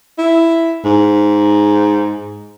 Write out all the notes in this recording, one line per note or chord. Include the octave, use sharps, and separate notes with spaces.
E4
G#2